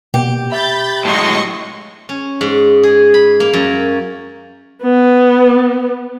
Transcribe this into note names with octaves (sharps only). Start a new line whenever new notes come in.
B2 A#3 G4
E5 B5 G6 A6
A2 F#3 G#3 D#5 C6 C#6
C#4
G#2
G#4
B5
A#3
F#2
B3